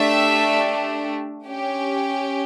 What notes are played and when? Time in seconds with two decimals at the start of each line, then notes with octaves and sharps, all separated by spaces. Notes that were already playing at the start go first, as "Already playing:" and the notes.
Already playing: A3 D4 G4 E5
1.46 C#4 G4